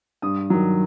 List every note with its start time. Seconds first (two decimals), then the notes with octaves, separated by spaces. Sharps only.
0.22 G2 D#6
0.50 D#3 F#3